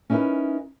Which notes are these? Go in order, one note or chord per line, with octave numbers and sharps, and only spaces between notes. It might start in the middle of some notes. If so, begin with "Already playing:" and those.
C#4 D#4 E4 G4 A#4 B4